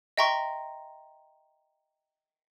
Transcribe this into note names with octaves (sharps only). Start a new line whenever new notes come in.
D#5 E5 G5 A#5 C6 C#6